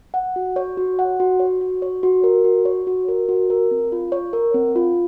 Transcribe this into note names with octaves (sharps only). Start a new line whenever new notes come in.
F#5
F#4
C#5
F#4
F#5
F#4
C#5
F#4
C#5
F#4
A#4
F#4
C#5
F#4
A#4
F#4
A#4
C4
F4
C#5
A#4
C4
F4